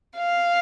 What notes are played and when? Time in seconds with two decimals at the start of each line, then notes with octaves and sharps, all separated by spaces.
0.18 F5